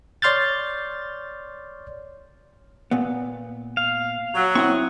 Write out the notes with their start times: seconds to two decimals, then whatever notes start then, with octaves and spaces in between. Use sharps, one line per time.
0.22 C#5 D5 C6 F6 G6 A6
2.91 A#2 B3
3.77 F5
4.35 F#3
4.55 C4 E4 F#5 C#6 D#6